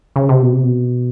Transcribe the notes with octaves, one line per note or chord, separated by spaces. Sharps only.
C#3
C3
B2
C3
B2